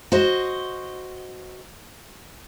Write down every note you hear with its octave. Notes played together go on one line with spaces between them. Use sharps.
F#4 C5 D#5